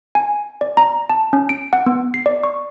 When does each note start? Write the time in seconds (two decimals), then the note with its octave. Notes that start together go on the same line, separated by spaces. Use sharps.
0.15 G#5
0.61 D5
0.77 A#5
1.10 A5
1.33 C#4
1.49 D7
1.73 F#5
1.86 B3
2.14 C7
2.26 D5
2.43 C#6